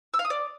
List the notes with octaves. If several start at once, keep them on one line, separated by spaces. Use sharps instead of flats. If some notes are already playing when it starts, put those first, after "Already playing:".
E6
F5
D#6
D5